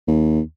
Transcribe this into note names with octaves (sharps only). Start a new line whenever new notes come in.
D#2